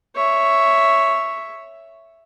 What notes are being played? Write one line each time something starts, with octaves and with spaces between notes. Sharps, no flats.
C#5 E5